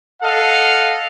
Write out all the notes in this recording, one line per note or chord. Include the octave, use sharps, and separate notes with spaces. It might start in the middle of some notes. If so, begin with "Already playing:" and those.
A4 D#5 F5 F#5